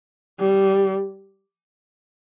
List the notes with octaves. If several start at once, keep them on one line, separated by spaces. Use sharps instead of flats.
G3